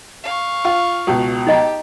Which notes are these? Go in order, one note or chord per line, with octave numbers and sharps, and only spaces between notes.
F5 C#6
F4
C#2 B2
D#4 G4 D#5 A#5